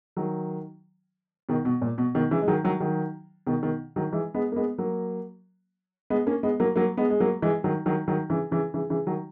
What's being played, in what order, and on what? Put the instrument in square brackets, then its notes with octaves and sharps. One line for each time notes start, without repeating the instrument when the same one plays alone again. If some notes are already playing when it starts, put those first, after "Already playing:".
[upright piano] D#3 F#3
B2 D#3
B2
A#2
B2
B2 D#3
C#3 E3
G#3
D#3 F#3
D#3 F#3
D#3 F#3
B2 D#3
B2 D#3
D#3 F#3
E3 G#3
G#3 B3
A#3
G#3 B3
F#3 A#3
G#3 B3
A#3 C#4
G#3 B3
F#3 A#3
F#3 A#3
G#3 B3
G#3
F#3 A#3
E3 G#3
D#3 F#3
D#3 F#3
D#3 F#3
C#3 E3
C#3 E3
C#3 E3
C#3 E3
D#3 F#3